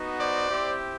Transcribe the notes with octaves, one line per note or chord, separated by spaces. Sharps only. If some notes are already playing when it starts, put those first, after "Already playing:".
Already playing: B3 D#4 F#4
C5 D5
C4 E4 G4